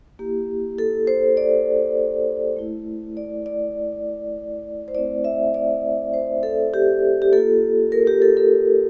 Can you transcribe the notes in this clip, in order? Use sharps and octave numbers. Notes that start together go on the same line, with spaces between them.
A#3 E4 G4
A4
C5
D5
A3 E4
D5
D5
C5
A3 C4 E4 D5
E5
D5
C5
A4
G4
G4
A#3 F4 A4
A#4
G4
A4
A4